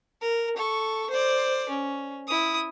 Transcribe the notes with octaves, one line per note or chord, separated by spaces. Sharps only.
A#4
A4 C#6
C5 D5
C#4
E4 D#6